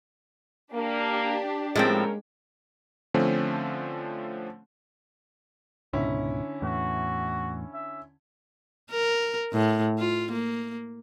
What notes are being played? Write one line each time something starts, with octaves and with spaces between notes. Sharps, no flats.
A#3 D4 G4
A2 F3 G#3 A#3 C4 C#4 A#4
D3 F3 A3 C4 C#4
C#2 G#2 B2 D3 C#4 E4
E2 A2 F#4
E5
A#4
A2
F4
A#3